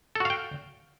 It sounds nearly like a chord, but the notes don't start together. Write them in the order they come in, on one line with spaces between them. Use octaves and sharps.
A4 F#4 F5 G5